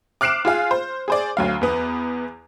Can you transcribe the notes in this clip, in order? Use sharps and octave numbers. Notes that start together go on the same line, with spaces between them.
D6 F6 F#6 C7 D7 E7
F4 G#4 F5
C5
G#4 C5 D5
D2 F#3 F5
E2 B3 D#6